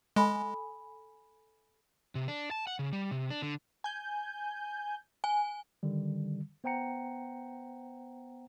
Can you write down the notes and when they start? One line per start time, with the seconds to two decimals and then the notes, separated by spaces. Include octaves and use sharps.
0.16 G#3 A4 G#5 B5
2.15 C3
2.28 D4
2.51 A5
2.67 F#5
2.79 C#3
2.93 G3
3.11 C3
3.30 D4
3.42 D3
3.84 G#5 G6
5.24 G#5
5.83 D3 D#3 G3
6.64 B3 C5 F#5 G5 A#5 C#7